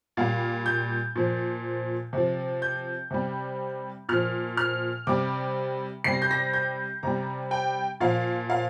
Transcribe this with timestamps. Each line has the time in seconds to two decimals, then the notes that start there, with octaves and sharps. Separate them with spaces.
0.17 A#2 G3 F5
0.66 G6
1.15 A#2 F3
2.13 C3 F3
2.62 G6
3.11 C3 G3
4.09 A#2 F3 F6
4.57 F6
5.07 C3 G3 D6
6.04 C3 G3 C7
6.13 A#6
6.22 G6
6.31 A#6
6.53 G6
7.03 C3 G3 A#5
7.51 G5
8.00 A#2 F3 F5
8.50 F5